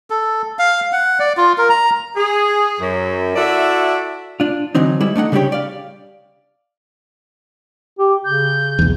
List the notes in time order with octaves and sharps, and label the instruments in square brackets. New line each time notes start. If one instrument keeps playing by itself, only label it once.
[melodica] A4
F5
F#5
D5
F4
A#4
A#5
[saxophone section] G#4
F#2
E4 F#4 A4 D5 E5
[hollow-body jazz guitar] D4 F4
D3 E3 F#3 C4 D#4
G3 G#3 E4
A3 D4 D#4 F#5
C#3 G3 D4 E4 G4 C#5
D5 F5
[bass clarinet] G4
[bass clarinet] C#3 [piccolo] G6
[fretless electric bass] B1 E2